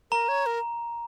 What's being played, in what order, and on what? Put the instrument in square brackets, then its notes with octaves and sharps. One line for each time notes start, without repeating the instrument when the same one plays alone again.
[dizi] A#4 [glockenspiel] A#5
[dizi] C#5
A#4